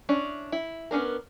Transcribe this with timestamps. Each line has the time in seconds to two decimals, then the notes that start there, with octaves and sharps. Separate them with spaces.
0.09 C#4 D4 E4
0.52 E4
0.91 B3 C#4 D4 A#4